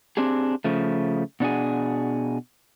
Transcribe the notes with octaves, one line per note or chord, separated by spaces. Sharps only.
C4 D4 G4 G#4
C#3 F3 A3
B2 D4 F#4 G#4